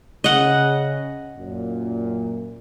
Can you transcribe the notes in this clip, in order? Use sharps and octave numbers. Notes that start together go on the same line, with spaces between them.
C#3 D#5 F#5
F#2 A#2